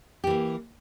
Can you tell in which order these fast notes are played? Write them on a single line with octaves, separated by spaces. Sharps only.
G4 E3 A#3